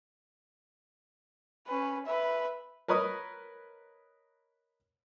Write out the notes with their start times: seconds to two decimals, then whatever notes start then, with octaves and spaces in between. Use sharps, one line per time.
1.68 C#4 B4
2.06 B4 E5
2.88 A#4 B4 C#5 D#5 D#6